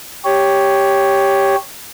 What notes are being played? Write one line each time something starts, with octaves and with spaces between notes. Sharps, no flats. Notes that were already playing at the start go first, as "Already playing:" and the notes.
G4 C#5